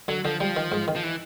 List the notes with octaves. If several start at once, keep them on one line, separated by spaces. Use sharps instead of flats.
D3 F#3
D3 F3
F3 G3
D#3
G#2
D#3
F3
E3